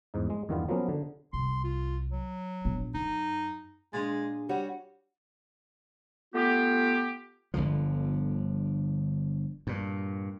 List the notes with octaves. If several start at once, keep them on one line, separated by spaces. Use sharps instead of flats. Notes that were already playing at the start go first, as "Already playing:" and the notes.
E2 G#2 D#4
G#3
E2 G2 D#3 G3 B3 F4
F3 F#3 A#3 B3 C#4
D3
C2 C6
F4
F#3
A#1 B3
F#2 D#4
A#2 G#3 D4 G#4 C6 A6
G3 F#4 C#5 F#5
A3 B3 F4 G4
G1 C2 D3 F3
G2 A#2